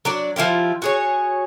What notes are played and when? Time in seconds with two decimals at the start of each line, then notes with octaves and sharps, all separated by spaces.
0.05 F#3 D4 D5
0.36 F3 E4 F4 G4
0.82 F#4 G#4 C#5